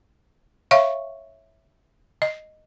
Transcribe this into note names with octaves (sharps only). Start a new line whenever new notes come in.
C#5 E5 F5 C#6
D#5